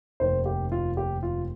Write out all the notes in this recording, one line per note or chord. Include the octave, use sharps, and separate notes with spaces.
F1 D#2 D#3 C5
G4
F4
G4
F4